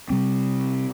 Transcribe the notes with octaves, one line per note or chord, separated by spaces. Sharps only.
C3 G3 C4